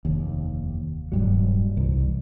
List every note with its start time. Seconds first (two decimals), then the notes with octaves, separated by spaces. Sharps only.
0.05 F1 D#2
1.12 D#1 G2 F#3
1.77 C2 E3